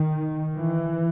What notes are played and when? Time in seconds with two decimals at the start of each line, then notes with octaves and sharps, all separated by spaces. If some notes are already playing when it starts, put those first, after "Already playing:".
Already playing: D#3
0.58 E3